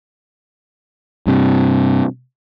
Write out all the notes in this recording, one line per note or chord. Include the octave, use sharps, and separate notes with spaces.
G2 C3